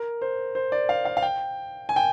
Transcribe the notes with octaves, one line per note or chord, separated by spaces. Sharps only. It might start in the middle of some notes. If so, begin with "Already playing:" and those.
Already playing: A#4
C5
C5
D5
F5
F5
F5
G5
G#5
G5